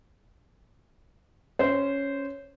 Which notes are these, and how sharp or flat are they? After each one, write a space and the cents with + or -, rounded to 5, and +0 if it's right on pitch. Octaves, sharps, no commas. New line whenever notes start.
C#4 +0 C5 -15